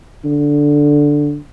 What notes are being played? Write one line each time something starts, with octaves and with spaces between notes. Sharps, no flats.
D3